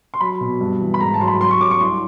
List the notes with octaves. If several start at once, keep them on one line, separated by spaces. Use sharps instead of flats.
C6
F#3 B5
B2
G2
E3
B5
G#2 A#5
A5
F#3 C6
B5
F#3 C6
C#6
F#3 D6
C#6
C2 C6